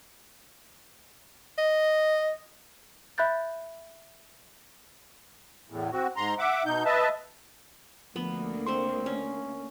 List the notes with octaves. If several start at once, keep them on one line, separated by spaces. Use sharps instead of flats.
D#5
E5 B5 F#6 G6 A6
E2 A2
C4 F#4
G#2 A#5 C6
E5 F#5 D6
B2 D#4 G6
B4 D#5 E5 A5
D2 F3 A#3 B3
C4 C5 C6 C#6
C#4